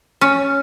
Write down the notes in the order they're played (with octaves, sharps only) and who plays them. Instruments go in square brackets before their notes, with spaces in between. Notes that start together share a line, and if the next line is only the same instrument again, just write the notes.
[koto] C#4